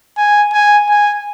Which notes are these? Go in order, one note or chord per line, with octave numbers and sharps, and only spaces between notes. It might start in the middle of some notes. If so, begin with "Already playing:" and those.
G#5
G#5
G#5